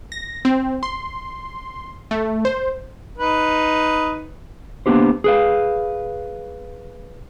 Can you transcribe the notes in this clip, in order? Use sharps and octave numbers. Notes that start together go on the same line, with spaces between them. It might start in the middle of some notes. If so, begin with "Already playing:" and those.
A#6
C4
C6
A3
C5
D#4 B4
A#3 B3 D4 G4 C5
G#4 B4 F5